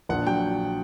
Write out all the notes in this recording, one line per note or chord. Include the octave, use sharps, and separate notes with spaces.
A#1 F#5
F#3 G5